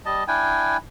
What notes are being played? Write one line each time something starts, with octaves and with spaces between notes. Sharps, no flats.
G3 D#5 A5
D4 E4 G5 G#5